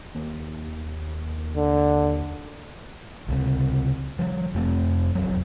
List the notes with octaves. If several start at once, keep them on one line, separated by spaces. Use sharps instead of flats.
D#2
D3
C#2 C3
F3 G3
F2 A3 B3 C4
E1 B1 F2 F#3